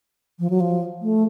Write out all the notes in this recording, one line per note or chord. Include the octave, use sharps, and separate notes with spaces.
F3
F#3
F3
A3